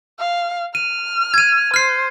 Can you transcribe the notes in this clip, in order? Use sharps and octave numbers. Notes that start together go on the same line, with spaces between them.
F5
F6 D#7
G#6 D#7
C5 F6 C7